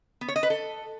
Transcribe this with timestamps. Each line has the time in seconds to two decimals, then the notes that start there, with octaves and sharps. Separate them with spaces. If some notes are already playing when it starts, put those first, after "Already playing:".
0.21 B3
0.28 C#5
0.36 D#5
0.43 B4
0.50 A4